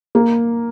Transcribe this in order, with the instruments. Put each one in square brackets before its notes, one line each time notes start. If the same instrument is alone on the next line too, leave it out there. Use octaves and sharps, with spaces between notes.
[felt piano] A#3